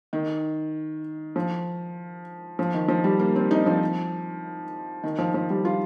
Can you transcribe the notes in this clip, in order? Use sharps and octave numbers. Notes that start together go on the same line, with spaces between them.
D#3
F3
F3
D#3
F3
G3
A#3
C4
D#4
F3
D#3
F3
F3
G3
F4